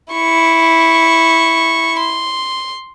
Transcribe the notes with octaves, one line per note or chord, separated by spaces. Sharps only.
E4 C#6
C6